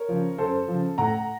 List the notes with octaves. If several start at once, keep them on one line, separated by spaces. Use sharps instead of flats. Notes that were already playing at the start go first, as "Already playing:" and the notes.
Already playing: A#4 C#5
C#3 F3
F#2 A4 C5
C#3 F3
A2 F#5 A#5